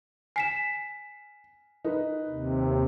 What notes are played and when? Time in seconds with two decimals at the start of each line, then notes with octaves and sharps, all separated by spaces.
0.36 G#5 B6 C7 E7
1.85 D#4 A#4 B4
2.28 D#2 C3